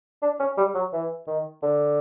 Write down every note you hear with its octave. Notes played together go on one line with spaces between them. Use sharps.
D4
C#4
G3
F#3
E3
D#3
D3